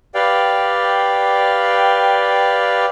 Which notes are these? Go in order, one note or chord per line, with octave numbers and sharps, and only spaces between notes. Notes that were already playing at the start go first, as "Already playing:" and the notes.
G4 B4 D5 F5 G5